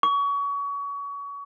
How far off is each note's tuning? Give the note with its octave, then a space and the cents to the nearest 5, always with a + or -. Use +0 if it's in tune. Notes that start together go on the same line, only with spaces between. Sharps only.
C#6 +30